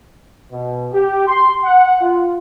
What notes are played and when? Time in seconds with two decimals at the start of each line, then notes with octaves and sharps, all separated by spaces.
0.51 B2
0.93 G4
1.27 C6
1.64 F#5
2.01 F4